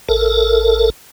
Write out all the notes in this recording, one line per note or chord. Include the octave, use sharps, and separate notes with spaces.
A1 A4 A#4